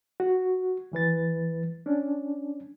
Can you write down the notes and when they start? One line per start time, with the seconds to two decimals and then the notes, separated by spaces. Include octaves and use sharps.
0.20 F#4
0.92 D#2 E3 B4 A6
1.86 C#4 D4